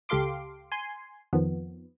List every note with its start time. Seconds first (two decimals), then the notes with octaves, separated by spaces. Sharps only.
0.09 C#2 G4 A4 F5 C6 D6
0.72 G#5 C6
1.33 F2 D#3 F3 B3